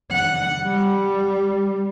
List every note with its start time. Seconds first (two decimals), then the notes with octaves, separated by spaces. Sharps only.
0.12 F#5
0.64 G3